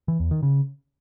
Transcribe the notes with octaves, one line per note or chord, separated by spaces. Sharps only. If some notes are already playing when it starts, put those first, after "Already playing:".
E3
E2
D#3
C#3